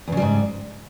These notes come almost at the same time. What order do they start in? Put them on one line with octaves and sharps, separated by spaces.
E2 C#3 G3 G#2